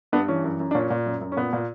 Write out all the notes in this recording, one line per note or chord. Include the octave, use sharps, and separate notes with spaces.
G2 B3 D4
E3 C#4
F#2
F#2
D4
A#2 C#4
A#2
F#2
F#2
C#4
A#2 B3
A#2